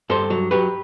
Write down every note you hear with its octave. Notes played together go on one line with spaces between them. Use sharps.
G2 A4 C5
F#3
F#3 G4 B4